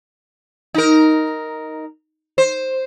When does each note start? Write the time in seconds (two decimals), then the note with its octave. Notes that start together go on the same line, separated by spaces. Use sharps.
0.74 D#4 A#4
2.38 C5